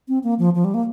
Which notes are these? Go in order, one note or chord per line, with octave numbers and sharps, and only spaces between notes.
C4
A#3
F3
F3
G3
A#3